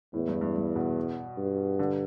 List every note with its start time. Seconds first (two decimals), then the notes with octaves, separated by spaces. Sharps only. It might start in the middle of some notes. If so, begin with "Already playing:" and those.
0.14 E2 A2
0.28 G2
0.41 G2
0.56 G2
0.76 B2
1.38 G2
1.79 D3